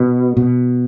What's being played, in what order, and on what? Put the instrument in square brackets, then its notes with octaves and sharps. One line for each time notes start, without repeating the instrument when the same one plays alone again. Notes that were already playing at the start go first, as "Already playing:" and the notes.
Already playing: [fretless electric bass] B2
B2